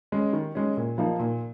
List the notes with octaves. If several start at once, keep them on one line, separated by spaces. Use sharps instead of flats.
G#3 C#4
D#3
G#3 C#4
A#2
F3 A#3 D#4
A#2